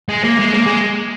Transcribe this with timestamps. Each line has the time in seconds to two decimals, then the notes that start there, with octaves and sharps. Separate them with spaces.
0.09 G#3
0.24 A#3
0.39 G#3
0.54 A#3
0.66 G#3